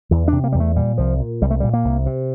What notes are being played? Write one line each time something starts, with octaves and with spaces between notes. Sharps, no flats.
E2 E3
C3 D4
A#3
E2 G3
A3
A#2 G3
C2 F3
A#2
C2 G3
A3
A#2 G3
A#3
C2
C3